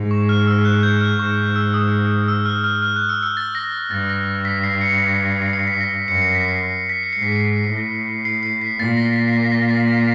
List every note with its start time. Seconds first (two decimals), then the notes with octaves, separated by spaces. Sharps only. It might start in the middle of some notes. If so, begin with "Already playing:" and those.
Already playing: G#2
0.11 C#6
0.29 F6
0.47 E6
0.65 F#6
0.83 G6
1.01 F6
1.19 G#2 C#6
1.56 E6
1.74 D#6
2.28 E6
2.45 F6
2.64 F6
2.82 F6
2.96 F#6
3.09 E6
3.23 E6
3.37 A6
3.55 A#6
3.91 G2 A6
4.10 A#6
4.45 B6
4.64 C7
4.81 C#7
5.53 C7
5.67 B6
5.81 A#6
5.94 B6
6.08 F#2 C#7
6.22 C7
6.35 B6
6.48 C7
6.89 B6
7.03 C#7
7.13 G#2 C7
7.23 B6
7.32 C7
7.70 A2
8.25 C7
8.43 C7
8.61 B6
8.79 A#2 A6
8.97 A#6
9.16 B6
9.34 B6
9.52 A#6
9.70 A6
9.88 A#6